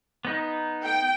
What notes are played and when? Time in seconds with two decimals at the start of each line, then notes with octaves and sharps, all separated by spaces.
0.25 B3 D#4
0.83 G5